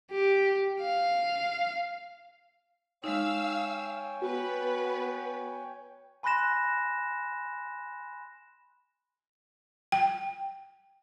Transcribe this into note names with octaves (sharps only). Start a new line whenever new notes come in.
G4
F5
G#3 D#4 C#5 F5 G5 G#5 E6
B3 F#4 B4
G#5 B5 C6 F#6 A#6 E7
G5